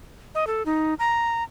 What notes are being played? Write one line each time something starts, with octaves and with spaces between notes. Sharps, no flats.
D#5
A4
D#4
A#5